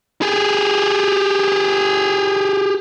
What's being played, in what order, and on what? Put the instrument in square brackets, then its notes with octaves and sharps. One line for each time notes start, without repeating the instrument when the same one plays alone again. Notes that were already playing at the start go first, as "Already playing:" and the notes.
[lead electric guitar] G4 G#4